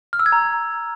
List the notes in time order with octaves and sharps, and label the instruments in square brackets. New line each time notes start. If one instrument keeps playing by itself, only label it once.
[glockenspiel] F6
E6
G#6
A#5